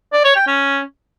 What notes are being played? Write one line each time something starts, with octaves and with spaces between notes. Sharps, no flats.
D5
C#5
G5
C#4